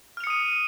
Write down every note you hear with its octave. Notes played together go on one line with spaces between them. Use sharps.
D#6 F6 C#7 D#7 F7